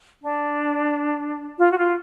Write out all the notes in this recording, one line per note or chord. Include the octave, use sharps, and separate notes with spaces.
D4
F4
F#4
F4